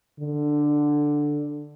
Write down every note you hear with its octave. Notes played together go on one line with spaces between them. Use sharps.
D3